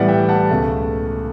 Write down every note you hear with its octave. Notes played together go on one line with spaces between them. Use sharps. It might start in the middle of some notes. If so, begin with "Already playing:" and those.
Already playing: A2 E3 G3 B3 D5 F#5
E5 G5
F#5 A5
C#2 B2 A3